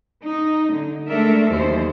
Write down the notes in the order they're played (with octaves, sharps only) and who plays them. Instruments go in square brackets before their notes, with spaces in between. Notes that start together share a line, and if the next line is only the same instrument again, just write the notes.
[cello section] D#4
D3
G#3 A3 D4 A4 A#4 E5
D#2 E3 F#3 C5